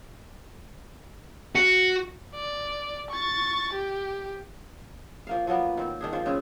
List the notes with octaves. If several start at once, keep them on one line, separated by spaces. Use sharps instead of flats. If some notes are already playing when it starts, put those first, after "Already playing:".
F#4
D5
C#6 A6
G4
F3 A#3 F5
F3 F#3 A#3 B3
D#3 C4
D#3 D4 G#4
D#3 F3 C5
C#3 G#3 C4 C#4